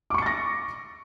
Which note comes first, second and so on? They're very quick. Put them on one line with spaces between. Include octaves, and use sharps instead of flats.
D6 C#6 C#7 A6 A#6